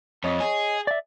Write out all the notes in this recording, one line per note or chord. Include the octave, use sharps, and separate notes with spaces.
F2 C#5 D#5
G#4
D5 E5